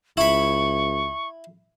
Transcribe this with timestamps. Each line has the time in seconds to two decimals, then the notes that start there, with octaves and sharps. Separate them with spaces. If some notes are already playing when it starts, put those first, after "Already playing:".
0.17 C#2 E4 B5 C#6